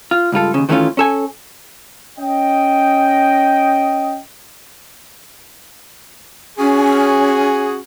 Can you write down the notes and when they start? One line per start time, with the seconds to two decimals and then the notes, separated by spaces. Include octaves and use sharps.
0.11 F4
0.32 C#2 G2 F4 A4
0.54 D#2 C#3
0.69 D#3 E3 A3 B3 C#4 F4
0.97 C#4 A4 G#5
2.18 C#4 D#5 G5
6.59 C#4 F#4 G#4